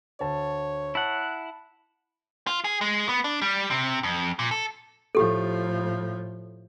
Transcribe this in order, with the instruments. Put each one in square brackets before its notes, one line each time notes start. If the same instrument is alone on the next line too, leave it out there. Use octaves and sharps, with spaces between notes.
[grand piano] D2 A5 [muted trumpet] C#5
[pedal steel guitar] E4 F#5 [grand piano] A5
[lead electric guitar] F4
G#4
G#3
B3
D4
G3
C3
F2
A#2
A4
[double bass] A2 F3 [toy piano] G4 A4